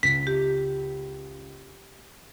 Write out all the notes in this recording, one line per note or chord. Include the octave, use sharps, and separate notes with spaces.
C#2 B6
G4